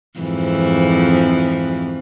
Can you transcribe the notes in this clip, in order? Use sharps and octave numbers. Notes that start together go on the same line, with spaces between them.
F2 G#2 E3